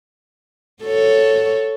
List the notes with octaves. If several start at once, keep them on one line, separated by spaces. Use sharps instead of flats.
F#4 A4 C#5